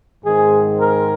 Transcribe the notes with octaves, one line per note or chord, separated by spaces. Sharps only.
G#2 D#3 G#3 C4 G#4
A#4